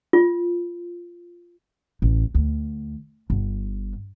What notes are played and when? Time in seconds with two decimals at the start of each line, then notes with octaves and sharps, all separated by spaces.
0.13 F4
2.02 A1
2.34 D2
3.30 G1